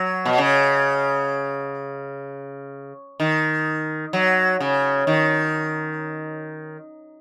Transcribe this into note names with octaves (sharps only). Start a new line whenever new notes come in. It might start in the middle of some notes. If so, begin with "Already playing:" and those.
Already playing: F#3
B2
C#3
D#3
F#3
C#3
D#3